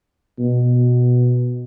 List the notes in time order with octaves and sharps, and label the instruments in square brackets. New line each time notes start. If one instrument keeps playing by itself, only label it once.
[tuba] B2